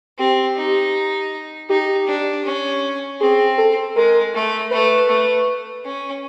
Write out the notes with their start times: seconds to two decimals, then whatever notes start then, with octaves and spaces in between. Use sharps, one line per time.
0.18 C4 G4
0.57 D#4
1.69 D#4 G4
2.07 D4
2.45 C#4
3.21 C4 G#4
3.58 A4
3.96 G#3 A#4
4.34 A3
4.71 A3 B4
5.09 A3
5.85 C#4